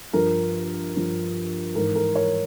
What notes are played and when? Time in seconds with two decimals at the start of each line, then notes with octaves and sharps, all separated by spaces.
0.13 G2 F3 A#4
0.94 G2 F3
1.75 G#2 E3 A#4
1.95 A#4
2.15 A#4 C#5